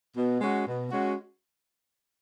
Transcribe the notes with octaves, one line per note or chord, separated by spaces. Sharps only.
B2
G#3 C#4 F#4
B2
G#3 C#4 F#4